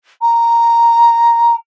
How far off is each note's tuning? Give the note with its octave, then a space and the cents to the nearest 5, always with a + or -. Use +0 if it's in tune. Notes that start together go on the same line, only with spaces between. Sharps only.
A#5 +0